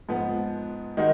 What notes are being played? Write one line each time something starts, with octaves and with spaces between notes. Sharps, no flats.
G#2 F3 B3
D#3 G#3 D#4 F#4